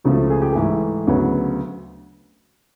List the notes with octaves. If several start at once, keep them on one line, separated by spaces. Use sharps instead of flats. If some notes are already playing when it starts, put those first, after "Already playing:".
C#2 C#3 F3 A3 F#4
G#4
G4
G#2 E3 A3 G#4
D2 C#3 F#3 B3